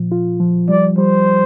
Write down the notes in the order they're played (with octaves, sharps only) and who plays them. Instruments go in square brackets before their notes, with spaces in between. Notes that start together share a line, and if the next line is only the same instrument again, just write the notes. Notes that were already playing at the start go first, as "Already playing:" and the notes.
Already playing: [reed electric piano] A#2 F3
F4
F3
[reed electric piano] G3 [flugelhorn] D5
[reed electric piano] G3 [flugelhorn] C5